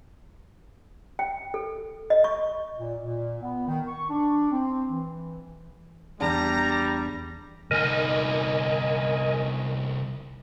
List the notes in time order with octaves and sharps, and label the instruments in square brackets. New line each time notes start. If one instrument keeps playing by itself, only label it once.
[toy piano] G5
A4
D#5
C#6
[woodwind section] A#2
A#2
B3
D#3
C#6
D4
C4
E3
[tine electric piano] E2 D4 [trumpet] G3 [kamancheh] A#5
[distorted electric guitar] C2 D#4 [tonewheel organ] A#4 D#5 G#5